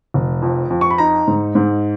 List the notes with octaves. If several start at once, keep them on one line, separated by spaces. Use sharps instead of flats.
F1
F2
F2
C#6
B5
D#4 A#5
G#2
G#2